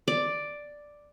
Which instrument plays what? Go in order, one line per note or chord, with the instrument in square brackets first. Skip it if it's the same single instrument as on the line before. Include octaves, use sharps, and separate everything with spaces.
[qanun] D5